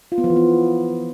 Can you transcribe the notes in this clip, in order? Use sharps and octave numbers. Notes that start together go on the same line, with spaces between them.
F4
B3
F3
E3
B3